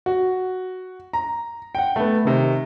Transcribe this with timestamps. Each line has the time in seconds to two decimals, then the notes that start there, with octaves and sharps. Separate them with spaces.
0.06 F#4
1.13 A#5
1.75 F#5 G5
1.96 A3 B3
2.25 C3 D#3